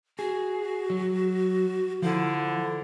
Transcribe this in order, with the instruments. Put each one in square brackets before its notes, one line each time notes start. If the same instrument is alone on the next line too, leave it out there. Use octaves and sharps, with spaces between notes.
[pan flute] F#4 [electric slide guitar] G#4
[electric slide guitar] F#3
[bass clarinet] D3 [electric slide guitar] F3 [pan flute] E4